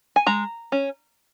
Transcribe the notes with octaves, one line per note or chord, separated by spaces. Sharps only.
G#5
G#3 A#5
C#4